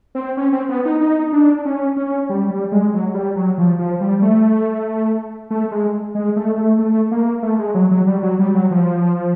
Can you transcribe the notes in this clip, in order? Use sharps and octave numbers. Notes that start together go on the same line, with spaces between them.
C4
C#4
C4
B3
D#4
D#4
D4
C#4
C#4
G3
G3
G#3
F#3
G3
F#3
F3
F3
G3
A3
A3
G#3
G#3
A3
A3
A3
A#3
A3
G#3
F#3
F#3
G3
F#3
G3
F#3
F3